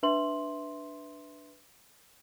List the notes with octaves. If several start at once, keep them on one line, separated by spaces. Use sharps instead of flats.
D4 B4 E5 C6 F#7